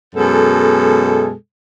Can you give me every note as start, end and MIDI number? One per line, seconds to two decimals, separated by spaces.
0.15 1.33 42
0.15 1.33 47
0.15 1.33 56
0.15 1.33 69